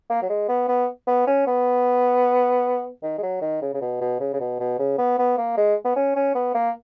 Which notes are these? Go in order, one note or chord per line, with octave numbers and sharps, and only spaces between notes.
A#3
F#3
G#3
B3
B3
B3
C#4
B3
D#3
G#3
F#3
D#3
C#3
C#3
B2
B2
C#3
C#3
B2
B2
C#3
B3
B3
A#3
G#3
B3
C#4
C#4
B3
A#3